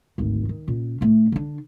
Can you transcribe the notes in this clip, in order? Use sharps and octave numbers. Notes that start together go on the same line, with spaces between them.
G#1 D2
D#3
A#2 C#4
A2 A3
D3 D4